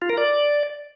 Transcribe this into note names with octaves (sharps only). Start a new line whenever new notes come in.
F4
A#4
D5